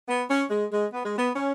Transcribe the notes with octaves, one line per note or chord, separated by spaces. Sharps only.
B3
C#4
G#3
G#3
B3
G#3
B3
C#4